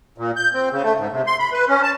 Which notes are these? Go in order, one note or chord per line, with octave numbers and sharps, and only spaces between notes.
A#2
G6
C4
C#3
A3
G#2
C3
C6
B5
B4
C#4
A5